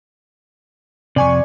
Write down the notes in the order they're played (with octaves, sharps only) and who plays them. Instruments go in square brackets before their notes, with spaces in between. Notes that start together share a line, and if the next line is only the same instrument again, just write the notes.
[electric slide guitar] F2 C3 [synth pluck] D5 G#5 C#6